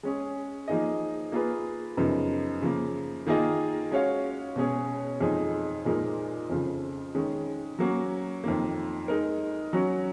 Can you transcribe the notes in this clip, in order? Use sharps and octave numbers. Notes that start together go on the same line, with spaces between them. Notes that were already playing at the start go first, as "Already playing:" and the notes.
G#3 C#4 G#4
F3 A#3 D#4 G#4 D#5
A#3 F4 G#4 B4
F#2 C#3 F3 B3 D#4
C#3 F3 A#3
D#3 A#3 F4 G#4 D#5
G#3 C#4 F#4 C#5 F5
B2 G#3 C#4 G#4 C#5
F2 F3 G#3 D#4 G#4
A#2 F3 G#3 D#4 A#4
F2 C#3 F3
D#3 G#3 C#4
F#3 A#3 C#4 F#4
F2 D#3 A#3
G#3 D#4 A#4
F#3 C#4 F#4